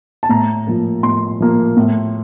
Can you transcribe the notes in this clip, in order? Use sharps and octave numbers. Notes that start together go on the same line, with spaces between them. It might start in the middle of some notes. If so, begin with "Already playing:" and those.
A5
A2 A#5
F3 A#3
A2 C6
F3 A#3
A2